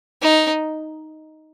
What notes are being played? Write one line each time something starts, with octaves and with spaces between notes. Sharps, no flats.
D#4